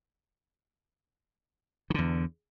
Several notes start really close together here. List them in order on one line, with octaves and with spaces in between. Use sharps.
D#3 D3 E2